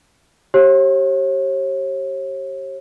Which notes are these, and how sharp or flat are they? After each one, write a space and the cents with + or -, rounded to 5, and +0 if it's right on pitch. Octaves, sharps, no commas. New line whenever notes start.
G4 -20 C#5 -40